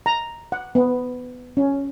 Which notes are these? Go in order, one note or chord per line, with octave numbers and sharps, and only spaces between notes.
A#5
F#5
B3
C#4